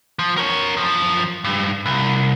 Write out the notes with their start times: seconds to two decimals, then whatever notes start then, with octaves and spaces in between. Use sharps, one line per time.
0.19 F3
0.37 A#4 C#5
0.77 F#2 F3
1.44 G2
1.86 C2